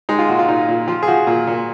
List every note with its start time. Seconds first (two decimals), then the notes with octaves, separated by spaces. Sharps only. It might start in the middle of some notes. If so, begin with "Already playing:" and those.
0.09 G#3 D#4
0.19 F4
0.29 A#2 F#4
0.39 F4
0.48 A#2 D#4
0.68 A#2
0.88 F3 F4
1.03 G#4
1.08 F3 F#4
1.27 A#2
1.47 A#2